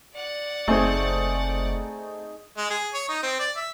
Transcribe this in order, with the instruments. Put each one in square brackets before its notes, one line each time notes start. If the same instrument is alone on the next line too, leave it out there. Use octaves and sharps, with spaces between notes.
[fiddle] D5 F#5
[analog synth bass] F#1 [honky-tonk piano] A3 C4 [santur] D#4 G#4
[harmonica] G#3
G#4
C#5
D#4
C4
D5
E5